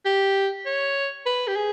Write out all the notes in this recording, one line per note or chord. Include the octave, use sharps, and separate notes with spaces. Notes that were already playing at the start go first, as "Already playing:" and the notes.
G4
C#5
B4
G4
G#4